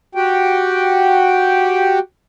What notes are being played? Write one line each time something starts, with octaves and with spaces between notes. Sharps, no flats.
F#4 G4 G5